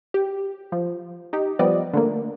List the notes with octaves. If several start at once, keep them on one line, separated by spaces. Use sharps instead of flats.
G4
F3
D#4 G4
F3 G3 B3 D5 D#5
D3 A3 A#3